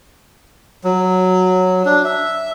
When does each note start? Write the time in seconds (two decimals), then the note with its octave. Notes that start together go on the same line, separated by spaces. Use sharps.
0.84 F#3
1.85 D4
2.04 E5